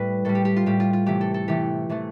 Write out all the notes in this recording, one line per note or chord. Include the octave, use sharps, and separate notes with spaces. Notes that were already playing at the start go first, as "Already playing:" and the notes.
Already playing: A2 G3 B4
A2 G3 A4
G4
G4
F4
A2 G3 G4
F4
F4
C3 E3 A3 G4
A4
A4
C3 E3 A3 G4
C3 E3 A3